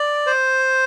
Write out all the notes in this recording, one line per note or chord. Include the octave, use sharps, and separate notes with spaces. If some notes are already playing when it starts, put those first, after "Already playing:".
Already playing: D5
C5